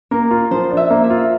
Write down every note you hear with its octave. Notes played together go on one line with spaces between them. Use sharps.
A#3 A#4
F4
F3 C5
D4
E5
A#3
E5
F4